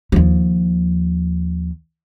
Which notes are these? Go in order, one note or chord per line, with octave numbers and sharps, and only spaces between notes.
D#2 F3